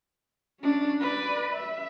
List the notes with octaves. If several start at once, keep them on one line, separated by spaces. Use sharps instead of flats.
C#4 D4
B4 D5
E5